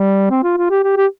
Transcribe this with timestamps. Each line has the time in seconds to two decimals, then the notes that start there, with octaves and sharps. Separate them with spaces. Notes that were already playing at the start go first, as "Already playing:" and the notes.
Already playing: G3
0.30 C4
0.43 F4
0.57 F4
0.70 G4
0.84 G4
0.97 G4